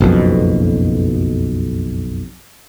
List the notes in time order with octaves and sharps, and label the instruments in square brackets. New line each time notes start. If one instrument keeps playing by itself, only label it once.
[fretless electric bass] F#1 B1 F2 B2